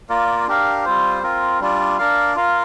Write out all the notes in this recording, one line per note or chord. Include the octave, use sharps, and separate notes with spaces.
A#3 F4 A#4 D5
D4 G4 A#4 F5
G3 C4 F4 C5
C4 F4 A#4
G3 D4 F4 D5
D4 A#4 D5 F5
F4 A#4 F5